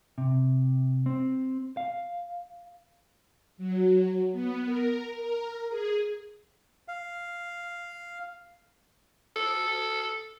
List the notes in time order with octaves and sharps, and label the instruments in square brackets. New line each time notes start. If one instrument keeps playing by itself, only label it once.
[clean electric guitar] C3
C4
F5
[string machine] F#3
B3
A#4
A#4
G#4
[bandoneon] F5
[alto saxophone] A4